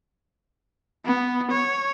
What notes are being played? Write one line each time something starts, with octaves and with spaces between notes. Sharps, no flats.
B3
C#5